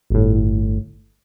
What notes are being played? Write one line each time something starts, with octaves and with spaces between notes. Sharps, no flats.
G1 A2